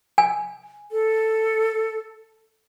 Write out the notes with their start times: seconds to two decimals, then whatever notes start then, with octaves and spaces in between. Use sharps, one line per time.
0.18 G#5
0.92 A4